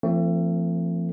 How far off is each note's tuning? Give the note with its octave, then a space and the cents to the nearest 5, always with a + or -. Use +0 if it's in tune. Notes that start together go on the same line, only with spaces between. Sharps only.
F3 -35 A3 +30 C4 +0